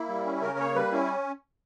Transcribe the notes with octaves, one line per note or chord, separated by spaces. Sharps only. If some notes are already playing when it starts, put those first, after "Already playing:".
Already playing: A#3 E4
G3
C#4
C#3 A#4
A#3 C#5
G3 B4
C#4 E4